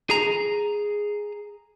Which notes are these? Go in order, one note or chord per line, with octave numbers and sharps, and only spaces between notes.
G#4 A#5